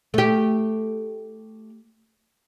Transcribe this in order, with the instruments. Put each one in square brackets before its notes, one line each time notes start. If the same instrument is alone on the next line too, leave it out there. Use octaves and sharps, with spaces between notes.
[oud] A3 G4